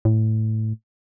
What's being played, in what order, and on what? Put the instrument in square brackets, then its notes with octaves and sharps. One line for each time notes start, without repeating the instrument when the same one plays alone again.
[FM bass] A2